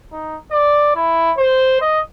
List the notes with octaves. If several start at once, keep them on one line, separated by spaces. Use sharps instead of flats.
D#4
D5
E4
C5
D#5